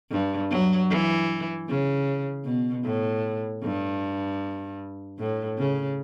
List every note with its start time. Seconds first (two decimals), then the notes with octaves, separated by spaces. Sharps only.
0.11 G2
0.50 F#3
0.90 E3
1.68 C#3
2.45 B2
2.84 A2
3.63 G2
5.19 A2
5.58 C#3